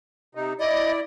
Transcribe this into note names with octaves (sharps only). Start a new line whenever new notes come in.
C3 D#4
E4 D5 D#5